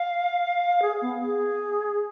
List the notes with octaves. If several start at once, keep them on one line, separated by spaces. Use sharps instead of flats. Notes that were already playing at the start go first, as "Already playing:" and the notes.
Already playing: F5
G#4
B3
G#4